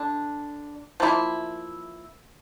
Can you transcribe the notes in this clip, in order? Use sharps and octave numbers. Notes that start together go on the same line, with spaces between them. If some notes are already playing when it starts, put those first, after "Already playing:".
Already playing: D3 D4
F3 A#3 E4